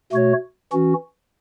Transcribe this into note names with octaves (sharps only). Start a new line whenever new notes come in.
B2 A3 F#4 C#5
E3 C#4 F#4